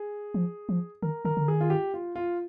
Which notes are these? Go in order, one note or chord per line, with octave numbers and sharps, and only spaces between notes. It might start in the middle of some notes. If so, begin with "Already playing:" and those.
Already playing: G#4
F3
F3
D#3 A#4
D#3 A#4
D3
D#3 G#4
F4
G4
F4
F4